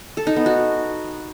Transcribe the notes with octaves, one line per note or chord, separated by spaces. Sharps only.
A4
D#4
B3
F#4